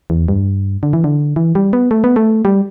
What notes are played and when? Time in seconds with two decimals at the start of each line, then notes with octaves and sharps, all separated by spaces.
0.10 E2
0.28 G2
0.83 D3
0.93 E3
1.04 D3
1.36 E3
1.55 G3
1.73 B3
1.91 A3
2.04 B3
2.16 A3
2.45 G3